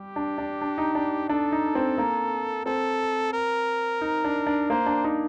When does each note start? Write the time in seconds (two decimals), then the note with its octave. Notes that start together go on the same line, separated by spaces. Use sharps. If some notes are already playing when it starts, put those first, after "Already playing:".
Already playing: G3 G4
0.16 D4
0.38 D4
0.61 D4
0.78 D#4
0.95 D4
1.29 D4 A4
1.52 D#4
1.75 C4
1.98 A#3
2.66 C4 A4
3.33 A#4
4.01 D#4
4.24 D4
4.47 D4
4.70 A#3 C5
4.86 D4
5.04 D#4